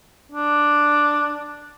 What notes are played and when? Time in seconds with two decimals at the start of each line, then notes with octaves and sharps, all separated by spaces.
0.32 D4